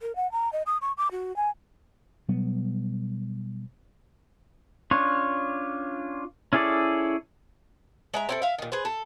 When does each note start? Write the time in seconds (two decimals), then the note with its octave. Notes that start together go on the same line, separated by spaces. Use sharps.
0.02 A#4
0.16 F#5
0.32 A#5
0.53 D#5
0.66 D#6
0.82 C#6
0.97 D6
1.11 F#4
1.36 G#5
2.29 B2 F#3 G3 B3
4.91 C#4 D4 F4 C#5
6.53 C#4 E4 G#4 A4 D5
8.14 G#3 E5 A#5
8.29 C4 E4 A4
8.42 E5 F5
8.58 A#2 D#3
8.72 G#4 B4 C5
8.85 A4